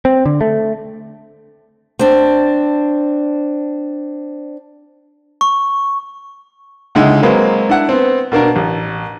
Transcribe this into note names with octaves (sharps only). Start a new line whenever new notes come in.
C4
D3
A3
C4 D4
C#6
C#2 D3 G#3 D#4 E4
F#3 G#3 A#3 C4 B4
D4 E4 F#5
B3 C4
B2 A#3 D4 A#4
A1